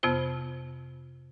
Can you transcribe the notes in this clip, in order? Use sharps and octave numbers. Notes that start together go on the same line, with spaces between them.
F2 C3 B3 F4 C5